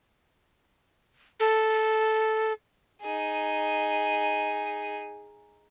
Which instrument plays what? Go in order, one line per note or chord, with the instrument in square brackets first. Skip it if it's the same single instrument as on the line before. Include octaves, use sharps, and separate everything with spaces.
[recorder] A4
[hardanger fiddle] D#4 G#4